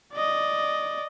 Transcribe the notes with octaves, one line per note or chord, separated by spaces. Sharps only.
D5 D#5